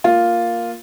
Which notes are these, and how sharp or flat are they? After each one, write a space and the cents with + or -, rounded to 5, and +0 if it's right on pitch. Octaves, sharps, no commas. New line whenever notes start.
A#3 +0 F4 +0